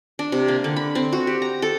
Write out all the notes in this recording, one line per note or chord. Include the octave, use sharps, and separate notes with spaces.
D4
C3
A#3
D3
B5
C4
F#4
G4
A#5
A4